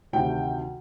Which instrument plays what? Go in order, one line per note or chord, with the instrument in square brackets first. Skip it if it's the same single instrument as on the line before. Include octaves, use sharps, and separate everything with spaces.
[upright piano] D2 C3 D#3 G5